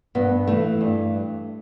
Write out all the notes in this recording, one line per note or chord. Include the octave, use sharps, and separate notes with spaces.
G2 B3
E3 A3
G2